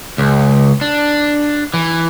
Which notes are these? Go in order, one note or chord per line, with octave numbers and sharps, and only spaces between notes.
C#2
D4
E3